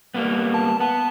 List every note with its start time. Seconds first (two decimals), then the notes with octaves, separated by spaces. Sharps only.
0.14 G3 A#3 B3
0.54 A5
0.80 B3 A5